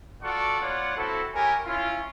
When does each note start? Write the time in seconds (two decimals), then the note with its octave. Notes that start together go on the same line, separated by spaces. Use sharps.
0.22 F4 F#4 A4 D5 F#5 C#6
0.60 B3 F4 C#5 D5 F#5
0.97 C4 E4 F#4 A4
1.34 E4 G4 A#4 C#5 G#5
1.65 C#4 E4 F4